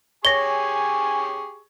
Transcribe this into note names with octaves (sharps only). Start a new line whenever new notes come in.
G4 G#4 C#5 G#5 C#6 A#6 G7